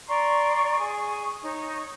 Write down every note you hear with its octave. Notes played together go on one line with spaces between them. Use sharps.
D5 A#5 C6 C#6
G#4 C#6
D#4 C#5